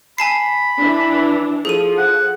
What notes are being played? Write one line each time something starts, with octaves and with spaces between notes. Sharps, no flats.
G#5 A5 B5 C7
E3 D4
F3 G#4 A4 D#7
F#5